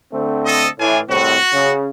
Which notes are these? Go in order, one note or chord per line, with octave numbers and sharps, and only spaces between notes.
D3 A3 C4
A4 D#5
A2 E3 D4 F4 G#5
C2 A2 C4 F#4
C#3